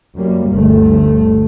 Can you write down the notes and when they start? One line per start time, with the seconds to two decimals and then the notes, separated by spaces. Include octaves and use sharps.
0.14 F#2 G3 A#3
0.48 G1 D2 A3